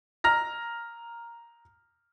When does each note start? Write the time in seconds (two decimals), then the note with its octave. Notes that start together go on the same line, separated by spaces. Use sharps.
0.24 A#5 F6 A#6